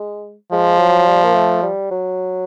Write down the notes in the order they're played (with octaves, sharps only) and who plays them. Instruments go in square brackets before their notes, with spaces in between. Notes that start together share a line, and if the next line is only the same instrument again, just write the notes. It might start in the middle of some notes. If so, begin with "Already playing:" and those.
Already playing: [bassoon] G#3
[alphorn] F3 [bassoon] G#3
[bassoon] F#3
G3
A#3
A3
G3
F#3